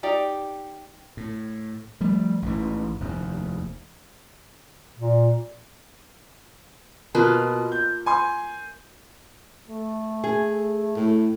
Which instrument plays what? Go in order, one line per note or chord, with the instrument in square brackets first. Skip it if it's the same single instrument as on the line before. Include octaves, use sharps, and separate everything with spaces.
[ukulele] D#4 G4 D5 A#5
[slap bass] A2
F3 G3 A3
A1 G#2 E3
F1 D#2
[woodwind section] A#2
[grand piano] B2 [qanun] A#3 F4 B4
[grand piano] G6
G#5 C6
[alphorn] A3
[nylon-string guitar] G#4
[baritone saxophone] A2